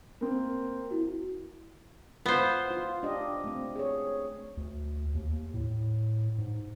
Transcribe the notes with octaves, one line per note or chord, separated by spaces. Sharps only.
A#3 C4
E4 F#4
B3 F4 C5
F4
D4 G4 D#5
A3 C4
G#4 C#5
D2
D#2
A2
G#2